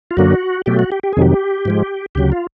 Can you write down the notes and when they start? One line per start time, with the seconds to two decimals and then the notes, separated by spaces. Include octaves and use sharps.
0.11 F4
0.17 F#2 D3 F#3 A#3 F#4
0.66 B2 F#3 A3 G4
0.79 F#4
0.92 G4
1.03 G4
1.13 G#4
1.17 F2 C3 D#3 F#3 G4
1.65 G#2 F3 G#3
2.15 D2 C#3 F#3 G4
2.32 F4